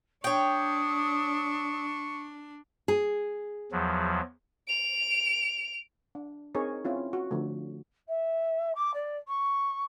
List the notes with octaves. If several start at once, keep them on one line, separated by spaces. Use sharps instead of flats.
D4 C#5 G5 C#6 D#6
G#4
E2 F3 F#3
D7 F7
D4
C4 D#4 G#4 A#4 C#5
C4 C#4 E4 F4
F#4
D3 F3 A3
E5
D6
D5
C#6